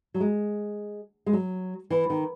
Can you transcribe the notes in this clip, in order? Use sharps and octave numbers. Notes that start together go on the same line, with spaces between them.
F#3
G#3
G#3
F#3
E3
D#3